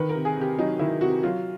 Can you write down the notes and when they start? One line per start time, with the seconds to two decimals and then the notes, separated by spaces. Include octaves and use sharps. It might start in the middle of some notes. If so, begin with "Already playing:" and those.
Already playing: D#3 B4
0.09 A#4
0.15 C3
0.25 G#4
0.37 C3 G4
0.58 F#3 D#4
0.79 D#3 E4
1.01 C3 F#4
1.23 F#3 F4